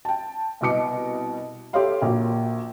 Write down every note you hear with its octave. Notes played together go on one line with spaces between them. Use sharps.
G5 A5
C2 B2 D#5 D6 C#7
G4 A4 C#5 E5 F5 C6
A#1 A#3 F#4